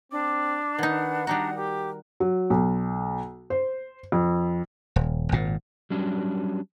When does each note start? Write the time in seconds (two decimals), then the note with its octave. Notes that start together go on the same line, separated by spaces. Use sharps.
0.12 C4 D4 D6
0.79 D#3 D#4 B4 F#5
1.27 G3 D4 D#4 F#4 A#5
1.56 G4 A#4
2.20 F#3
2.50 B1
3.50 C5
4.12 F2
4.96 D#1
5.32 G#1 A#2
5.90 F#3 G3 C#4 D4